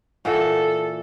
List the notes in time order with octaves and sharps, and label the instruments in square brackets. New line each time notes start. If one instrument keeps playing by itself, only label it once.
[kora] A#2 E3 F#4 [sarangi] A4